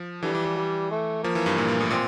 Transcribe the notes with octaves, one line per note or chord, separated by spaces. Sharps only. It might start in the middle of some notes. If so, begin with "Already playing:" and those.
Already playing: F3
D3 E3 G3
E3
E3
G3
A3
F3 A#3
E3
G2
A#2
A#2
A2
A#2 C4